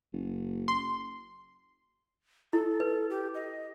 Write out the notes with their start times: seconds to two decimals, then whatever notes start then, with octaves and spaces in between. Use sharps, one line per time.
0.13 F#1
0.68 C6
2.53 E4 A4
2.80 B4
3.10 G4
3.34 D#5